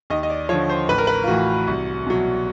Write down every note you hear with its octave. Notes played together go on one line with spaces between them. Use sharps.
D#2 D#5
D#5
D5
D3 F3 C#5
C5
A1 B4
A#4
B4
F4
A2 E3 F#4
C2
B2 F#3